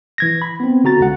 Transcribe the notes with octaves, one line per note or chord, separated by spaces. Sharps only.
E3 G#6 A#6
B5
B3 C4
D3 F#4 A#5 A6
C#2 F#5